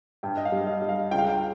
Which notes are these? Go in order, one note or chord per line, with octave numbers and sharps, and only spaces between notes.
G2 G5
D#5
F5
G3
D#5
G3
F5
C#2 G5
F5
G5